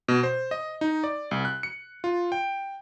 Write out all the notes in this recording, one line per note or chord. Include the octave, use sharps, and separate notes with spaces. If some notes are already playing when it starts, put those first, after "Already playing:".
B2
C5
D#5
D#4
D5
C2
F#6
C#7
F4
G5